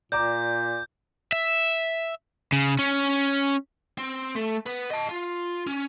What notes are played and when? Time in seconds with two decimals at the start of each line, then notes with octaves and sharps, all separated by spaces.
0.12 A#2 D5 A#5 D6 G6
1.32 E5
2.52 C#3
2.79 C#4
3.98 C4
4.35 A3
4.66 B3
4.91 D#5 A5
5.09 F4
5.67 C#4